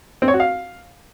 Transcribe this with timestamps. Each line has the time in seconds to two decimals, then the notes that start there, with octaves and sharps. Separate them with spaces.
0.22 C4
0.28 C#5
0.34 F#4
0.40 F5